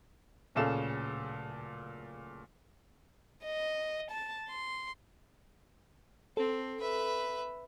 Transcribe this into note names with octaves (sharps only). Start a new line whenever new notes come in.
D1 A#2 C#3 A4 F5 E7
D#5
A5
C6
C4 A4
B4 E5